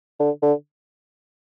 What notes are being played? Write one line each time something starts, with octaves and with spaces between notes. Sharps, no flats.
D3
D3